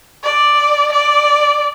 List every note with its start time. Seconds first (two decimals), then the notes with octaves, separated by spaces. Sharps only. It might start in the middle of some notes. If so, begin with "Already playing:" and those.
0.24 D5
0.92 D5